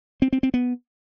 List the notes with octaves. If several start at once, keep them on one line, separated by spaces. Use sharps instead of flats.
C4
C4
C4
B3